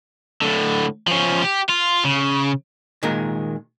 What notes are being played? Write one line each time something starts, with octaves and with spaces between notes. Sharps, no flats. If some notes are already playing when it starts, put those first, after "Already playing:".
A2 D3
F3 C#4
G4
F4
C#3
A#2 D#3 G#3 A#4